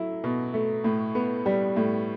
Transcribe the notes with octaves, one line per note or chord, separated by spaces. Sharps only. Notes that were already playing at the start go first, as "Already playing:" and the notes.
Already playing: F#3 A3 E4
B2
A3
A2
B3
G3
A2